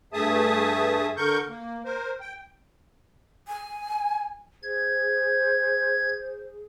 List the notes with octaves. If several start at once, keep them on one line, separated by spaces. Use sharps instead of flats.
G2 A3 G#4 E5 A5 D#6
D3 A#4 C#6 G6
A#3
A#4 C5
G5
G#5
G#4 C5 G#6